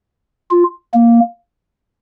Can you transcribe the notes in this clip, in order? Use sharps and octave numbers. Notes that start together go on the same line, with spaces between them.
F4
A#3